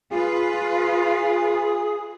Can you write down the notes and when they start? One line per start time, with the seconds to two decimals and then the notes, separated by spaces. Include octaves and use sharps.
0.11 F4 G#4 B4